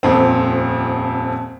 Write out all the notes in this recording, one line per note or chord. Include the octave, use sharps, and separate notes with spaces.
D#1 F2 C4